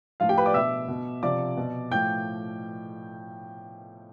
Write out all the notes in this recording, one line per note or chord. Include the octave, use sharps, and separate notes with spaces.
A2 F3 F4 F5
G4 G5
B4 B5
D5 D6
B2 E5 E6
B2
C3 F3 D5 D6
B2
A2 F3 G5 G6